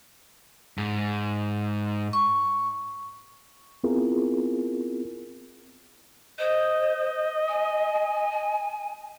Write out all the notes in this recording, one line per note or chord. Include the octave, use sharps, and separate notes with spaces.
G#2
C#6
B3 C4 E4 F4 G#4 A#4
C5 D#5
G#5